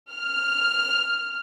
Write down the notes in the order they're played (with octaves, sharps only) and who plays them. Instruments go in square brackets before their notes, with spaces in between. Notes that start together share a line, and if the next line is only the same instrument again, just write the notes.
[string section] F6